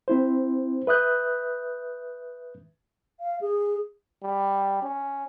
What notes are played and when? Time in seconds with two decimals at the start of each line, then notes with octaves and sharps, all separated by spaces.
0.08 C4 E4 C5
0.87 B4 E5 D#6 F#6 G6
3.20 F5
3.41 G#4
4.22 G3
4.82 C#4